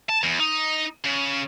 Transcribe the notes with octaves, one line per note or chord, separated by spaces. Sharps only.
A5
E2
D#4
C#3